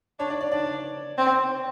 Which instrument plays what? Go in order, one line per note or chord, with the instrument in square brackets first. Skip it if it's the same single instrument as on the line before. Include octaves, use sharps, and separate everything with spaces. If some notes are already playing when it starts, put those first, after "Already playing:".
[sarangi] D4 [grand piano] C#5
[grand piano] D5
D5
[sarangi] D4 [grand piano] D5
[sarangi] C4